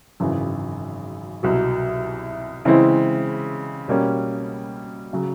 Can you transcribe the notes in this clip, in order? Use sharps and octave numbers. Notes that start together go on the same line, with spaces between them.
G#1 F#2 C#3 E3
C2 B2 F#3
C#3 E3 G#3 C4 E4
B2 G3 A#3 C#4
C#3 F#3